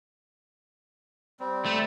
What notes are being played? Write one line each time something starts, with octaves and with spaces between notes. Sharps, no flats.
G3 C4
A3